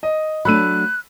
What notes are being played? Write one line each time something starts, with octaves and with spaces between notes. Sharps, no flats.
D#5
F#3 A3 D4 B5 E6 F#6 D#7